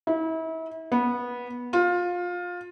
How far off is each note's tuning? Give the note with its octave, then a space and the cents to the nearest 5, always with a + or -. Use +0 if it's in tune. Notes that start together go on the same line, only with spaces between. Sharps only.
E4 -35
B3 -15
F4 +20